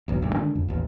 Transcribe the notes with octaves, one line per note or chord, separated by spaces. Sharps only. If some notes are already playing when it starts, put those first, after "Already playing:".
F#1 B1 E2
F#1 D2 G2
D3 D#3 G#3 D4
F2
A1 D#2